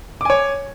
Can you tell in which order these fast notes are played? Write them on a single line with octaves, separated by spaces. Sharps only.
D6 G#5 C#5